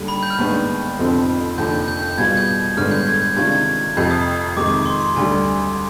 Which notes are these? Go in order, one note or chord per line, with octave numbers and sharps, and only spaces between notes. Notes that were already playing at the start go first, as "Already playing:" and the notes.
Already playing: D#2 D3 G3
B5
G6
F6
D#2 D#3 G#3 B3 D4 G6
F1 F2 D3 F3 C4
F1 D#2 D3 F3 G6
G6
G6
G6
B2 G3 B3 F4 G#4 G#6
G6
G1 G2 D3 G#3 B3 F6
G6
G#6
G6
C3 D#3 G#3 D4 F4 G#6
G#6
F2 C3 F3 G6
D#6
F2 C3 D#3 G#3 D6
D6
D6
C6
C6
D2 D3 G3 G#5